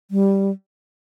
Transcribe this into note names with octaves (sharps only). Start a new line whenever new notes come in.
G3